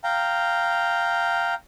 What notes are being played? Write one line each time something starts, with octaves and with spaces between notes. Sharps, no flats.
F5 G5 A#5